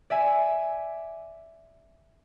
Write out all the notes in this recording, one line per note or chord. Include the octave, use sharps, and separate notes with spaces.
D5 E5 G#5